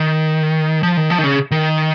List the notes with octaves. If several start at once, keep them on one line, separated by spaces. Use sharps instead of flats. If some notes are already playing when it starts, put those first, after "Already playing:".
Already playing: D#3
F3
D#3
F3
D#3
C#3
D#3